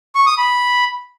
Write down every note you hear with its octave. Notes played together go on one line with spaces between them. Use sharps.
C#6
D#6
B5